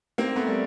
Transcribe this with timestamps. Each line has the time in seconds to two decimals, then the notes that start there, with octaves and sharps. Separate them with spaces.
0.18 A#3 C4
0.36 A3 B3
0.46 G3